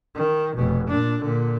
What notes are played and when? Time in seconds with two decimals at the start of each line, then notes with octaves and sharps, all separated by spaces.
0.14 D#3
0.55 F1 B2
0.88 A#2 D4
1.20 A#2 D3